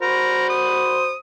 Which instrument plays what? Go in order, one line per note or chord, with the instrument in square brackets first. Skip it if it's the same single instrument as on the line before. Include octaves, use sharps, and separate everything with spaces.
[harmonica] F#4 C5 B5 [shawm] A#4
[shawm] D#6